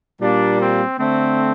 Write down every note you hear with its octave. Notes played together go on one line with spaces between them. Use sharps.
A#2 G3 A#3 D4
C4
D3 A3 C4